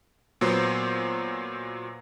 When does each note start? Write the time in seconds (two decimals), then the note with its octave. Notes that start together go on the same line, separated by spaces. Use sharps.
0.41 A#2 F#3 B3 C5